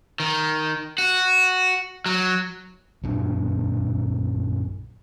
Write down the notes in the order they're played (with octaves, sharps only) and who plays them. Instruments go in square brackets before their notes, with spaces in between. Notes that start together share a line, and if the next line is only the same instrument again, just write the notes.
[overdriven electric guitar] D#3
F#4
F#3
[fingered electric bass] B1 F#2 A#2 D4